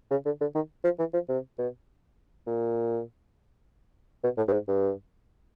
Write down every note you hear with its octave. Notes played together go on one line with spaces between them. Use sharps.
C#3
D3
D3
D#3
F3
E3
F3
C3
B2
A#2
B2
A2
G2
G#2
G2